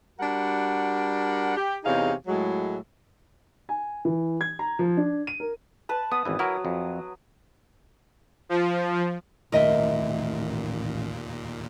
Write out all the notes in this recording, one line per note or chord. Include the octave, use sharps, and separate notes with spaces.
G3 D4 F#4 A#4 F#5
G4
E2 C3 D#4 G#4 C#5 F5
A2 F#3 G#3
G#5
E3
G#6
A#5
F3
D4
D#7
A#4
B4 A5
B3 D#6
G#1 E2 E3
F#3 E4 A#4
F2
F3
A1 D#2 A#2 D#3 A3 A#4 D#5 E5